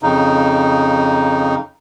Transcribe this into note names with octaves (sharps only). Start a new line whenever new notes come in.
F2 C#3 D#4